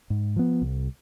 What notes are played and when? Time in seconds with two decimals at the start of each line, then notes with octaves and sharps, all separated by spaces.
0.10 G#2
0.36 F3 B3
0.62 C2